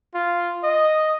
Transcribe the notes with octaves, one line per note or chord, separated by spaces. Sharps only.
F4
D#5